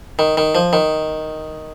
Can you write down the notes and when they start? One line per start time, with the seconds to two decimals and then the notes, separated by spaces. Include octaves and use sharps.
0.19 D#3
0.37 D#3
0.55 F3
0.73 D#3